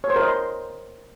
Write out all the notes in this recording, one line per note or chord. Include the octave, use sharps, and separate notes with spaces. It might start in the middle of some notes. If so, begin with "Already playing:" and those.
C#5
C5
A#4
D#5
C6